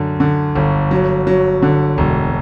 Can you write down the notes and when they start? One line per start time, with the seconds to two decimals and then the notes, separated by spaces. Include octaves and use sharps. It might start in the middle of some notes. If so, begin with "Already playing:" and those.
Already playing: F#2 D3
0.20 D3
0.55 G1
0.91 F#3
1.27 F#3
1.62 D3
1.98 E1